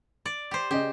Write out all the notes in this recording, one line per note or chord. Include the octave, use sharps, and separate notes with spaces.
D5
G4 C5
C#3 G4 D#5